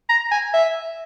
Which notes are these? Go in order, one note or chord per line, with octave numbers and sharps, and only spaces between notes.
A#5
G#5
E5